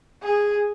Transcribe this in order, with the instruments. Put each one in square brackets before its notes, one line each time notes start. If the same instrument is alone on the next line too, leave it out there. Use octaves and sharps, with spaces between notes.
[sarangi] G#4